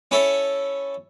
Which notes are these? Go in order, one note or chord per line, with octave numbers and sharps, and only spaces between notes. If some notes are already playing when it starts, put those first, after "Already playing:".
C#4 E4 A4 C#5